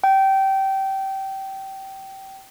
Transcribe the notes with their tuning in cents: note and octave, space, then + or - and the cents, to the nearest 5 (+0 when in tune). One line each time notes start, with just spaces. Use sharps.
G5 -20